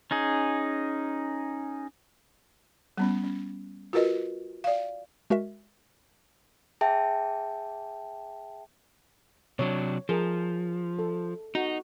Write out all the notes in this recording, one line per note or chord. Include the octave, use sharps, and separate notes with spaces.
C#4 D#4 G#4
G3 B3 C#4
C#4
F4 F#4 A#4 B4 D#5
D5 F5
G#3 F#4 A#4 E5
G#4 E5 G5 A5
C3 F#3 D4 C#5
F3 G#4 A#4
A4
D#4 F#4